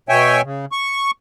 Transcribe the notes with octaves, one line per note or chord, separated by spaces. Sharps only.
B2 C#5 E5 G5 G#5
C#3
C#6